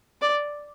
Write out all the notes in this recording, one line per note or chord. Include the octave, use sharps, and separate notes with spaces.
D5